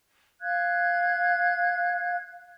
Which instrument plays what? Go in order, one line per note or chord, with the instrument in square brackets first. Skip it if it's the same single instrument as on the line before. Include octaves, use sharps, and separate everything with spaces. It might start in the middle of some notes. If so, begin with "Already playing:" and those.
[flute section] F5 F#6 G#6